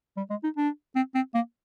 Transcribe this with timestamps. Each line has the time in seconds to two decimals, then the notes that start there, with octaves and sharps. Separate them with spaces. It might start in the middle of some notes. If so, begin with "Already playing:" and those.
0.17 G3
0.30 G#3
0.44 D#4
0.57 D4
0.96 C4
1.15 C4
1.34 A#3